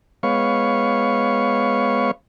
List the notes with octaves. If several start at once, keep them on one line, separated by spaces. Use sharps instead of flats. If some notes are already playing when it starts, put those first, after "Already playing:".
G#3 B3 B4 C#5 F5 C#6